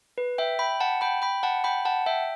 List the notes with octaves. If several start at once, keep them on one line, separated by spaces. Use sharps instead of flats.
B4
E5 G5
G5 B5
F#5 A5
G5 B5
G5 B5
F#5 A5
G5 B5
F#5 A5
E5 G5